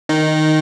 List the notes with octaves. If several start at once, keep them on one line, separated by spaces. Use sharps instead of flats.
D#3 D#4